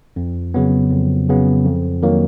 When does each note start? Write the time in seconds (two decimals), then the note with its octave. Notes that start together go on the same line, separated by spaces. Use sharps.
0.16 F2
0.54 C#3 F#3 B3
0.91 F2
1.29 C#3 F#3 B3
1.65 F2
2.03 D#3 F#3 A#3